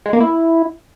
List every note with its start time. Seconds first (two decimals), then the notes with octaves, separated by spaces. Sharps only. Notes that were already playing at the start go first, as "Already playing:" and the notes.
0.06 G#3
0.13 A#3
0.20 E4